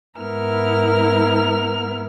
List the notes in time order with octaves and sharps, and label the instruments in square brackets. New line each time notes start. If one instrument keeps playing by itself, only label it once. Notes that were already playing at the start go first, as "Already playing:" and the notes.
[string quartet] G#2 B3 E4 A#4 F6